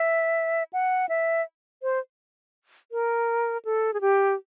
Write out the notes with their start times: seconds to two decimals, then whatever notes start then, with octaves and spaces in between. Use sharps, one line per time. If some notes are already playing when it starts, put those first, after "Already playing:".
Already playing: E5
0.73 F#5
1.09 E5
1.83 C5
2.92 A#4
3.65 A4
3.94 G#4
4.01 G4